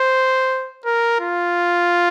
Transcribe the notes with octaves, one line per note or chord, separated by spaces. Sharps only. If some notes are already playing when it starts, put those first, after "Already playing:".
Already playing: C5
A#4
F4